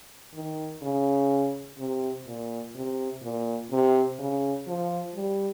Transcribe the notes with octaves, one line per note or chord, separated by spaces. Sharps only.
D#3
C#3
C3
A#2
C3
A#2
C3
C#3
F3
G3